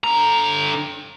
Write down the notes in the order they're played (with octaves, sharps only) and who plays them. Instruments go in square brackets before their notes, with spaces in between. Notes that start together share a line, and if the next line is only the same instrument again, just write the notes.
[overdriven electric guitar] D3 A#5